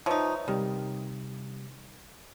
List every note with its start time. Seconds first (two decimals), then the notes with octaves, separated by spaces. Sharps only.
0.06 F3 D#4 B4 C#5 E5
0.48 C3 D#3 G3